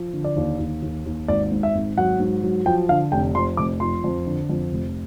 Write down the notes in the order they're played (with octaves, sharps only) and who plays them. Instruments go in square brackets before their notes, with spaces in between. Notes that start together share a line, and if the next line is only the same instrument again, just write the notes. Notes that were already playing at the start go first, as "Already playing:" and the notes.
Already playing: [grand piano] F3
D3
D5
D#2
D#2
D#2
D#2
G#1 D5
G#2
E5
G#1
F#3 F#5
G#2
F#3
F3 G5
D3 F5
F1 G5
F2 C6
F1 D6
F3 C6
F2
D3
F2
F1